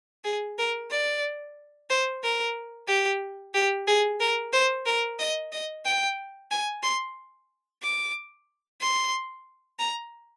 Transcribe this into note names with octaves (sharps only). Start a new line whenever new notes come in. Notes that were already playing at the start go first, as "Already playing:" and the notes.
G#4
A#4
D5
C5
A#4
G4
G4
G#4
A#4
C5
A#4
D#5
D#5
G5
G#5
C6
D6
C6
A#5